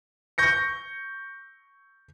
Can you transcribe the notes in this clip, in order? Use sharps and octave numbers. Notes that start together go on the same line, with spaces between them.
C#6 G6 A#6 C#7